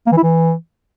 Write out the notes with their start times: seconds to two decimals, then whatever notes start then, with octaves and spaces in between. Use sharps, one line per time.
0.07 A#3
0.12 E3
0.18 E4
0.23 E3